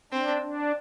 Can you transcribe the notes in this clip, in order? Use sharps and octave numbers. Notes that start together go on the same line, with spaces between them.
C4 D4
D4